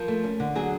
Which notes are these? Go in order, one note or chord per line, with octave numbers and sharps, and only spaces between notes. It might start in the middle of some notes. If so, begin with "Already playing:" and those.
Already playing: F3 A#4
A3
C#4
D3
F#3 G#4